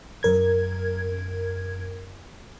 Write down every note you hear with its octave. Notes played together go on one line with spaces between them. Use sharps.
F#2 A#4 G#6